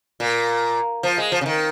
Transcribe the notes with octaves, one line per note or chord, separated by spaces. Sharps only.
A#2
F3
G#3
F3
C#3
D#3